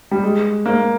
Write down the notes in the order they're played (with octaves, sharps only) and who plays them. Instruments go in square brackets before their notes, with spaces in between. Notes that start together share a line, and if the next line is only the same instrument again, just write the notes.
[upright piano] G3
G#3
A#3